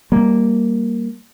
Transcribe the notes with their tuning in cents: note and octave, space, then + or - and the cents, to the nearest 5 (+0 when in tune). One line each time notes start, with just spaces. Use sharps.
G3 +0 A#3 +0